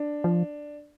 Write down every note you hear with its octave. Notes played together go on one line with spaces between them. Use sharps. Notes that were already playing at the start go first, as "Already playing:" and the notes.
Already playing: D4
F3